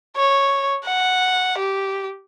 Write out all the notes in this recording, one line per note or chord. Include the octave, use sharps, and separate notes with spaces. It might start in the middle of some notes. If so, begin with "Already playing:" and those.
C#5
F#5
G4